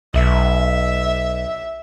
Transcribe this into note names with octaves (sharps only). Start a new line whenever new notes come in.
B1 E5